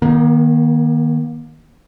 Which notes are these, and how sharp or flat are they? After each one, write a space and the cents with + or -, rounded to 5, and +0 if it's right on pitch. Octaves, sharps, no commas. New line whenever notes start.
D#3 +0 A#3 +40